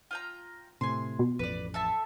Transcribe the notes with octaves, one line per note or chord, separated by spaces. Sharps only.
F4 G5 A#5
A2 C3 G#5 C6
B2
A1 F2 B4 D5
A4 E5 A5